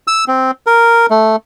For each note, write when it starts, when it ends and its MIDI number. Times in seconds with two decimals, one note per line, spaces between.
0.08 0.25 88
0.28 0.51 60
0.66 1.06 70
1.10 1.36 57